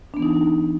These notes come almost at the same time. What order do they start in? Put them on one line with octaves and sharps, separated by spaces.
D4 B3 E3 D#4